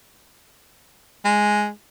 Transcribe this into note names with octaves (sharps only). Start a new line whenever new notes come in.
G#3